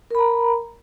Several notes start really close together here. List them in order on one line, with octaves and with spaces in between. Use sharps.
A#4 B5 A#5